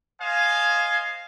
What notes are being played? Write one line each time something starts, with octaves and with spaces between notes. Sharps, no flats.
C5 D#5 F5 G#5